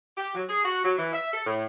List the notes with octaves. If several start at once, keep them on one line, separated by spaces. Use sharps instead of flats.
G4
F#3
G#4
F#4
F#3
E3
E5
A4
A2